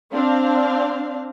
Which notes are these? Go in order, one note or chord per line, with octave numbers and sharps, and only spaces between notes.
C4 D4 F5